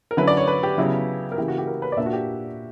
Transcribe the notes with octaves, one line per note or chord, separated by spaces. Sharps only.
A#4
D3 F#3 C#4 E4 B4
D5
C#5
B4
G4
C#3 F#3 B3 E4
A#4
C#3 E3 A#3 E4 G4
F#4
G4
A#4
B4
D5
A#2 A#3 D4 E5
F#4
G4